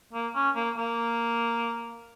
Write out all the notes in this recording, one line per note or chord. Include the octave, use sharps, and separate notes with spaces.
A#3
C#4
A#3
A#3